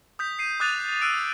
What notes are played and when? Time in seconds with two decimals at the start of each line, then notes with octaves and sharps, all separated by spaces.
0.19 D#6 G6 B6
0.39 C7 D#7
0.60 D6 D#6 F#6 A6 D#7 F7
1.01 E6 F#6 D7 D#7